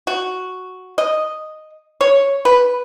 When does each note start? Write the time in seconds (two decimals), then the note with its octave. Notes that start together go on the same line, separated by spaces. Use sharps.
0.07 F#4
0.98 D#5
2.01 C#5
2.45 B4